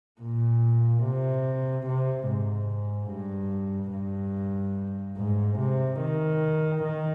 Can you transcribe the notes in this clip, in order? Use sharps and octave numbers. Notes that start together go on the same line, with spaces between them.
A#2
C3
C3
G#2
G2
G2
G#2
C3
D#3
D#3